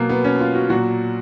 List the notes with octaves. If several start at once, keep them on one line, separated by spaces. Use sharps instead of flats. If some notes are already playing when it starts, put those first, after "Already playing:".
Already playing: B2 F#3 A#3
B3
C#4
F4
F#4
A#2 F#3 F#4